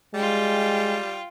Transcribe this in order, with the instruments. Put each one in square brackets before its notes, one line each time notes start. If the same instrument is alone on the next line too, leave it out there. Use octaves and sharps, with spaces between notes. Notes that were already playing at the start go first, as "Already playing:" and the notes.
[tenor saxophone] G3 [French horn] G#3 [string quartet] F4 G5